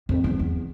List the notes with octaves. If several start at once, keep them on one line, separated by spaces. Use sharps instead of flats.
F2
E2
E2